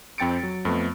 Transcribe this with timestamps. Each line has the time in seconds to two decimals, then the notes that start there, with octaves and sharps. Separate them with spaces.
0.18 F2 C4 G5 A6 C#7 D7
0.43 F#3
0.65 F2 A3 B3